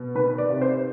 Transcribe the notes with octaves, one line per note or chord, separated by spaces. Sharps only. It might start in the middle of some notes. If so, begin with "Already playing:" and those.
Already playing: B2
D#3 B4
D5
C3
C5